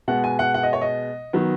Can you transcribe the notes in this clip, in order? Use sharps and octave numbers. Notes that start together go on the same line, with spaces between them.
B2 G#3 B3 F#5
G#5
F#5
F#5
D#5
C#5
D#5
D#3 F#3 B3